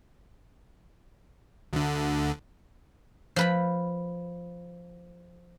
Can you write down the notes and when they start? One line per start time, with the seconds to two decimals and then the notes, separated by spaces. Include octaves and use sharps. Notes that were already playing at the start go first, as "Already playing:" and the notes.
1.73 D2 D3
3.36 F3 B4 B5